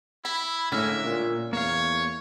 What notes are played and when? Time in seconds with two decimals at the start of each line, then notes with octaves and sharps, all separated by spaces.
0.25 E4 B5
0.72 A2 D3 G#3 A#3 C#4 E5
1.05 A#2
1.53 E2 A#3 C#5 F5